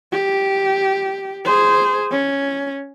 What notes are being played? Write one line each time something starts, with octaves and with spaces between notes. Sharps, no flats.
G4
G#4 C5
C#4